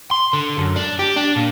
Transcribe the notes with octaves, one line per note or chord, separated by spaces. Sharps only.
C6
D3
F#2
D4
G4
D4
A#2